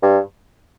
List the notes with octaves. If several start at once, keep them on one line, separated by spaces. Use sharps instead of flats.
G2